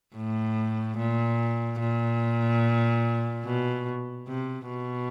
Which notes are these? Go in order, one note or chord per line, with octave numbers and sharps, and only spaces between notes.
A2
A#2
A#2
B2
C3
B2